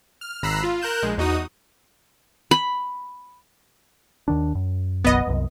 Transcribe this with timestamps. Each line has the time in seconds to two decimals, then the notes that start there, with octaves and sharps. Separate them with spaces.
0.21 F6
0.43 G#1 A#5 B5 E6 F#6 C7
0.63 F4
0.82 A#4 F#6 G6 E7
1.03 A#1 G#3
1.18 E2 D#4 F#4 D#6
2.51 B5
4.28 D#2 D#3 D4
4.55 F#2
5.04 F#1 B1 F#2 B3 D#5
5.27 C2 F#2